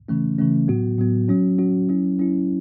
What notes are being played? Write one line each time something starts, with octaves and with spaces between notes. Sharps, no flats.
C#3 E3 A3 C#4
C#3 E3 A3 C#4
A2 F#3 B3 F#4
A2 F#3 B3 F#4
F#3 C#4 F#4
F#3 C#4 F#4
F#3 C#4 E4
F#3 C#4 E4